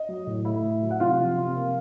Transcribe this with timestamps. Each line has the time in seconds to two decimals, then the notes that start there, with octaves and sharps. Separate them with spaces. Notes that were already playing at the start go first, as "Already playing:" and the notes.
Already playing: D#5
0.09 F#3
0.27 A2
0.45 A3 E4 E5
0.63 A2
0.83 F#3
0.91 F#5
1.00 C3 F4 F5
1.19 F3
1.38 C3
1.56 A#3